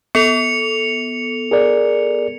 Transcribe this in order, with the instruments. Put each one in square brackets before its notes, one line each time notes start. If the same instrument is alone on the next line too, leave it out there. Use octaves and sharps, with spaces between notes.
[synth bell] B3 A4 [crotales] C#7 F7
[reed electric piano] G#4 A#4 D5